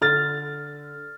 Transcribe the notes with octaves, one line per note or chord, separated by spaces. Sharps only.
D3 F6 A6